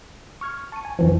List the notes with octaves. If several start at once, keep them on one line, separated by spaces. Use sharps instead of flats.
C#6 F6 G#6 C#7
F6
A5 C#6 C#7 D#7
G#5
F2 E3 F3